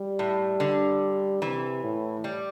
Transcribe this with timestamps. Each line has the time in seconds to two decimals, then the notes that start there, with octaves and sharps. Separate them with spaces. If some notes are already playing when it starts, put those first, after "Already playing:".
Already playing: G3
0.19 A2
0.60 D3
1.42 C3 E3
1.84 A2
2.24 G3